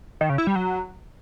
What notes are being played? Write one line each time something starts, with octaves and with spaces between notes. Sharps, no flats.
D#3
C#3
E4
G3
F#3